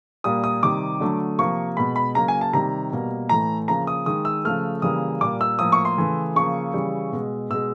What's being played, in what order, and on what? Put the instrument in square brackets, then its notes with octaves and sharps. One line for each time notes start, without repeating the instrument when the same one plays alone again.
[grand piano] A#2 G3 A#3 D#6
D#6
C3 D#3 G3 D6
D3 F#3 A3
C3 F3 A#3 C#6
B2 G#3 B5
B5
C#3 F#3 A#3 A#5
G#5
A5
C3 D#3 G3 A#5
B2 G3 A#3
A2 E3 A3 A#5
C#3 F3 A#3 A#5
D#6
D#3 G#3 D#6
E6
C#3 F3 A3 F6
C#3 E3 G3 A#3 D#6
A#2 G3 A#3 D6
E6
A2 F3 A#3 D#6
C#6
C6
C#3 E3 A3
C#3 F3 A#3 C#6
C#3 E3 G3
B2 G#3
B2 G#3 E6